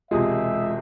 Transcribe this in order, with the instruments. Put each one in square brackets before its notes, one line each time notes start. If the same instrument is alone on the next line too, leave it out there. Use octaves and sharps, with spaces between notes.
[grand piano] E1 C3 G#4 [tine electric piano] G#3 [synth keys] F4 G#5 D#6 [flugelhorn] E5